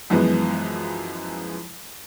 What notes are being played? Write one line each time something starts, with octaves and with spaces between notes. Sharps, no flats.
F#2 E3 F3 G#3 B3